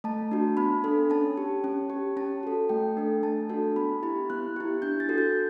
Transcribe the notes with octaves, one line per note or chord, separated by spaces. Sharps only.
A3 A5
D4 F#4
B3 B5
D4 A4
C#4 A5
G4
C#4
G4
C#4 A5
F#4 A4
A3 G5
D4 A4
A3 A5
D4 F#4 A4
B3 B5
E4 G4 B5
B3 F#6
E4 G4
D4 G6
A6
F#4 A4
G6